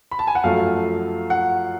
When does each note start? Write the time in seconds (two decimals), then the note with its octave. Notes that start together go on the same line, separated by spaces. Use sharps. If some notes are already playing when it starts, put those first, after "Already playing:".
0.11 B5
0.19 A5
0.27 G#5
0.35 F#5
0.44 F#2 F3 A3 F5
1.30 F#5